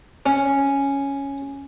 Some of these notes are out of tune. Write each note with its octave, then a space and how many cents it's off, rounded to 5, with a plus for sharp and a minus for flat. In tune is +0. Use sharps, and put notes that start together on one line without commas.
C#4 +0